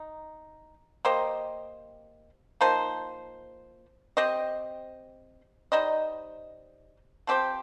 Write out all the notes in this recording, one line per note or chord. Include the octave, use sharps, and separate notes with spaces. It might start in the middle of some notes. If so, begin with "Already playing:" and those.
Already playing: D#4
A#3 G4 C5 D#5
F3 A#3 D#4 C5
C4 G4 C5 D#5
G3 D#4 C5 D#5
F3 C4 G4 C5